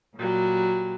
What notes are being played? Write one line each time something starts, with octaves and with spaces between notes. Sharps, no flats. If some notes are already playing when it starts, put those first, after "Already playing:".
A#2 F#3 G3